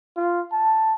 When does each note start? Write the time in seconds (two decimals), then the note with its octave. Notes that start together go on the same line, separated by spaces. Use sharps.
0.17 F4
0.52 A5